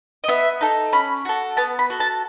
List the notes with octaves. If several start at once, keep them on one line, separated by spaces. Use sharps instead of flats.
D#5
B3 E5
D#4 A4
C#4 B5
F#4 A4
B3 A5
B5
F#4 A4
A5